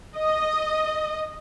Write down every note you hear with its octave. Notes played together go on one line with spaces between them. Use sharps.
D#5